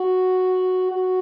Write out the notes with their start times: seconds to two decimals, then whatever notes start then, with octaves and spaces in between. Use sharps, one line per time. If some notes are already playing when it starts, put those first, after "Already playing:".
Already playing: F#4
0.91 F#4